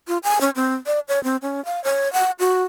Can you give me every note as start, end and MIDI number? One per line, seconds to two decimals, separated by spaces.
0.08 0.18 65
0.23 0.41 80
0.41 0.50 61
0.55 0.75 60
0.86 1.00 74
1.08 1.22 73
1.24 1.37 60
1.42 1.64 61
1.65 1.83 77
1.84 2.11 73
2.13 2.31 78
2.39 2.64 66